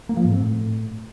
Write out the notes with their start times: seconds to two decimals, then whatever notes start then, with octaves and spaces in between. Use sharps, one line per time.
0.09 A#3
0.17 F3
0.25 G#2
0.32 C4
0.40 A2